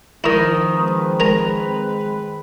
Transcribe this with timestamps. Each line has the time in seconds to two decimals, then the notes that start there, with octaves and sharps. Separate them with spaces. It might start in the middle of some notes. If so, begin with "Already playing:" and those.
0.24 D#3 F3 E4 A#4
0.74 G#3 C4 B4
1.20 A#4 G#5 A#5